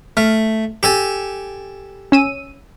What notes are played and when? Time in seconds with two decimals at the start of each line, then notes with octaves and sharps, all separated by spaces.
0.17 A3 F6
0.83 G4 A4 G#5
2.12 C#4 E6 D#7